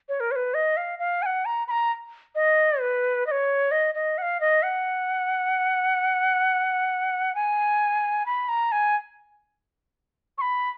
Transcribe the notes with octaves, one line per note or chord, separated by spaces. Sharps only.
C#5
A#4
C#5
B4
D#5
F5
F5
G#5
F#5
A#5
B5
A#5
D#5
B4
D#5
C#5
D#5
D#5
F#5
F5
D#5
F#5
G#5
B5
A#5
G#5
C#6
B5